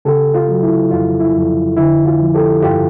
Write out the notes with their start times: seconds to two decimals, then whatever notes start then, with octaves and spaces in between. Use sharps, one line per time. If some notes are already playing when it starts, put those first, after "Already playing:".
0.05 C#3 G4 A4
0.34 F4
0.48 F#3
0.63 E4
0.91 F2 F4
1.20 E4
1.34 F2
1.77 D3 E4
2.05 F4
2.19 F3
2.34 G4 A4
2.63 G2 F4 G4